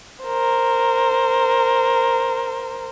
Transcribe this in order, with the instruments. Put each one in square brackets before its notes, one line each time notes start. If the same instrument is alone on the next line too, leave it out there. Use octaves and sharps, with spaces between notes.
[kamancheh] A#4 C5